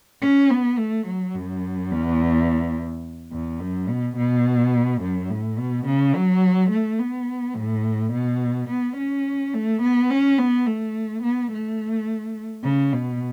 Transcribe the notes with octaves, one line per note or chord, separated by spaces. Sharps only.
C#4
B3
A3
F#3
F#2
E2
E2
F#2
B2
B2
F#2
A2
B2
C#3
F#3
A3
B3
A2
B2
B3
C#4
A3
B3
C#4
B3
A3
B3
A3
C#3
B2